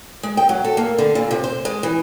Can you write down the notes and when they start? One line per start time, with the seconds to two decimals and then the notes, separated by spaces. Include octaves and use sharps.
0.23 G#3
0.37 G5
0.49 F#3
0.65 A4
0.77 A#3
0.98 D3
1.15 A#2
1.31 C3
1.44 C5
1.65 G#3
1.83 E3